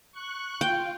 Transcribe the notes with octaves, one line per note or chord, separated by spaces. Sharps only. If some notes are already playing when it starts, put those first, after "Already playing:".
C#6 F#6
F4 G5